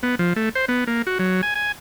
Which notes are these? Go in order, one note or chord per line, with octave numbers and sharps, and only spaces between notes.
B3
F3
A3
C5
B3
A#3
F#4
F#3
G#5
G#5